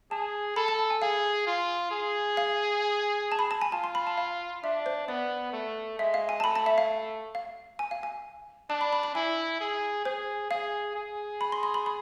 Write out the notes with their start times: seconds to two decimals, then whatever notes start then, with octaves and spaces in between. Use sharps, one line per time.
0.11 G#4 A5
0.56 A4 B5
0.68 A5
0.79 A5
0.90 G#5
1.02 G#4 F5
1.47 F4
1.91 G#4
2.37 F5
3.32 A5
3.39 B5
3.51 A5
3.61 G#5
3.72 F4 A5
3.84 C6
3.95 B5
4.07 A5
4.18 F5
4.63 D4 E5
4.86 C5
5.08 B3 D5
5.53 A3
5.98 G#3 E5
6.14 F5
6.29 G#5
6.40 A5
6.43 A3 B5
6.56 A5
6.66 E5
6.78 F5
7.35 F5
7.79 G#5
7.91 F5
8.03 G#5
8.70 D4 A5
8.81 B5
8.93 B5
9.03 B5
9.15 E4 G#5
9.60 G#4
10.05 G#4 C5
10.50 G#4 F5
10.96 G#4
11.41 B5
11.52 C6
11.63 C6
11.74 B5
11.86 B5